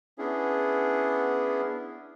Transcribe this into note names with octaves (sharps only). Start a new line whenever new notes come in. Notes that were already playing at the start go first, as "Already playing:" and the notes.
B3 C#4 D4 E4 G#4